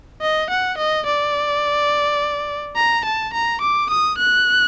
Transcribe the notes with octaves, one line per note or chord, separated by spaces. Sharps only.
D#5
F#5
D#5
D5
A#5
A5
A#5
D6
D#6
F#6